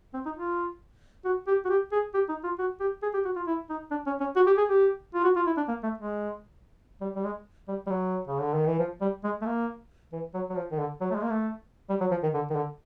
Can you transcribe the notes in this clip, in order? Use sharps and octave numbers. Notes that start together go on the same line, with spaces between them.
C4
D#4
F4
F#4
G4
F#4
G4
G#4
G4
D#4
F4
F#4
G4
G#4
G4
F#4
F4
E4
D#4
D4
C#4
C#4
F#4
G4
G#4
G4
F4
F#4
F4
E4
D4
A#3
A3
G#3
G3
G3
G#3
G3
G3
F#3
C#3
D3
D#3
E3
F3
G3
G#3
A3
A#3
E3
F#3
F#3
F3
D#3
D3
F#3
A3
G#3
A#3
A3
G3
F#3
F3
D#3
D3
D#3
D3